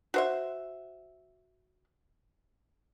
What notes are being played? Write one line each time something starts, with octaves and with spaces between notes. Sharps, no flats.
F#4 C5 E5